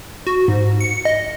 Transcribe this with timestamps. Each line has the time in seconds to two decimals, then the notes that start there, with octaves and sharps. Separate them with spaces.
0.27 F#4
0.48 G#2
0.81 C#7
1.05 D#5